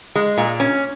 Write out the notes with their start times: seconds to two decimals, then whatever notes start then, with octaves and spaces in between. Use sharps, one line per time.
0.16 G#3
0.38 A#2
0.60 C#4